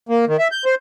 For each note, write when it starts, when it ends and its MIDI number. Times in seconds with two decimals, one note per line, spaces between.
0.09 0.25 58
0.27 0.37 51
0.39 0.48 76
0.52 0.64 91
0.65 0.75 72